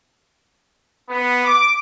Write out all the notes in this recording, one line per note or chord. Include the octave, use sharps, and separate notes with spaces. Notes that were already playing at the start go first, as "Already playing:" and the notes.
B3
D6